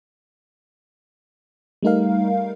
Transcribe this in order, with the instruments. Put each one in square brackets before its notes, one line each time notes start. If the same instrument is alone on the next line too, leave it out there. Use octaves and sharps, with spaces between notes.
[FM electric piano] G3 A3 D#4 A#4 F5